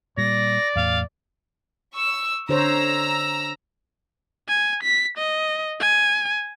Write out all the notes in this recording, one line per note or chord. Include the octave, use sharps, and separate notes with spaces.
A#2 G3 D5 A#6
E2 A2 A3 F5
C#6 E6
D3 C5 C#5 A#5 E6
G#5
B6
D#5
G#5